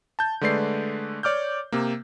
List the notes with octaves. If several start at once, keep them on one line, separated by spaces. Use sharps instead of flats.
A5 G6
D3 G#3 A3 B4 D5 C7
C#5 D5 D6 F6 G6
C3 A#3